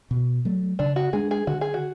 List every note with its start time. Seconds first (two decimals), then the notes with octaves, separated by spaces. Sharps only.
0.11 B2
0.45 F#3 A3
0.79 C#3 D4
0.96 F#4
1.13 G#3 D4 G#4
1.31 G#4
1.47 D3 F#4
1.61 G#4
1.74 F#4